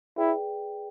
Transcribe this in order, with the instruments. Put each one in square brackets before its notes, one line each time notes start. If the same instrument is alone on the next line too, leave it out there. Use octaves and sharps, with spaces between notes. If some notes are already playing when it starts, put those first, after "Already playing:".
[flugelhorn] E4 [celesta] G#4 B4 D5 G5